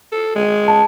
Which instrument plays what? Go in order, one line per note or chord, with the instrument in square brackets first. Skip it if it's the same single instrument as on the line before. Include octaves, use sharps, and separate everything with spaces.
[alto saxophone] A4
G#3
[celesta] A5